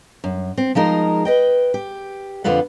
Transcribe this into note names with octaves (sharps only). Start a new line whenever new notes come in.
F#2
C4
F3 G#3 D#4 A#4
B4 D#5 G5
G4
F2 D3 F4 B4 F#5